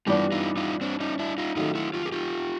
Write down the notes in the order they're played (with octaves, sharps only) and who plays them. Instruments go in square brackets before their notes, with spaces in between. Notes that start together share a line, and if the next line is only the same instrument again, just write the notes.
[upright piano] G2 E3 G3 B3 D4 [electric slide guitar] F4 G4
[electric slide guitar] D#4 F4
D#4 F4
C4 D4
C#4 D#4
D4 E4
D#4 F4
[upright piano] D#3 F#3 A3 [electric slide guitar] D#4 F4
[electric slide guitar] E4 F#4
F4 G4
G#4
F4 G4